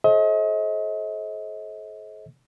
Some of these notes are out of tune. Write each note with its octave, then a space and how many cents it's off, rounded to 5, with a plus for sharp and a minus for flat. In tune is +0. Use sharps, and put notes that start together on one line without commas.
A4 -45 C5 +45 D#5 +35